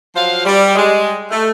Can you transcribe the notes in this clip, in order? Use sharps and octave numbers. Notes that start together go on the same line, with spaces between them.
F3 F#3 C5 F5
G3
G3 G#3
A3